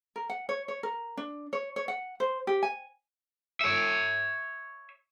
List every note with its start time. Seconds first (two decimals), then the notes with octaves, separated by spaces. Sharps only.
0.16 A#4
0.30 F#5
0.49 C#5
0.68 C#5
0.83 A#4
1.17 D4
1.53 C#5
1.76 C#5
1.88 F#5
2.20 C5
2.47 G4
2.63 G#5
3.61 C#5 E5